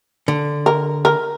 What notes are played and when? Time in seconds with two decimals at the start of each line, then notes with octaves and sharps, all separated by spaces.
0.28 D3
0.66 A#4
1.05 A#4